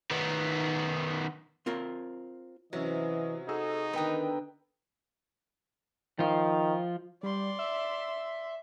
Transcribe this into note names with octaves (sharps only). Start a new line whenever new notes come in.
D#3 B3
C4 F4 A#4 C#5
C3 E3 F#3 C#4 D#5
D#4 F#4 G#4 A4 E6
D3 D#3 B3 G5 A#5 D#6
D#3 F3 F4
G3 D5 C6
E5